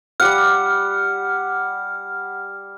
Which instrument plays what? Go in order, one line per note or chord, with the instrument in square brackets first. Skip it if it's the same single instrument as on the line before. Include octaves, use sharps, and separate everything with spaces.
[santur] G3 G4 F#5 [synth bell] F6